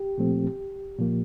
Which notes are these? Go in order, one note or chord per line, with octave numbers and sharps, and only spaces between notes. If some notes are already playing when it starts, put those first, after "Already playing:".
Already playing: G4
A#2 F3 A3 C4
A#2 F3 A#3